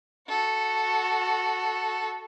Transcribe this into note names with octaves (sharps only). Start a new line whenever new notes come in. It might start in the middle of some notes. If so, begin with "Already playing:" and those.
F#4 A4